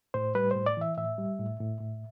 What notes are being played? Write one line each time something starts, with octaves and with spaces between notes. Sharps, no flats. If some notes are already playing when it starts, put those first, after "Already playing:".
A2 C5
G3 B4
A2 C5
D5
E3 E5
A2 E5
G3
A2
A2
A2